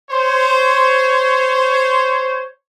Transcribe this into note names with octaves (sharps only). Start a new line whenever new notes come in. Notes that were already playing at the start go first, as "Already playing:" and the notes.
C5 C#5